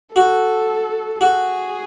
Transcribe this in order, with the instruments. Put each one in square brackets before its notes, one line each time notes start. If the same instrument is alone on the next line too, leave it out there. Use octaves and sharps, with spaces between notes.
[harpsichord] F#4 [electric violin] A4
[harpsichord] F#4 [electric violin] G#4